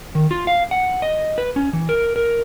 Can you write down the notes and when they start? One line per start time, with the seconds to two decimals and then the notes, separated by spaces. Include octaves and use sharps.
0.15 D#3
0.31 F4
0.47 F5
0.71 F#5
1.02 D#5
1.38 B4
1.56 C#4
1.73 E3
1.89 A#4
2.16 A#4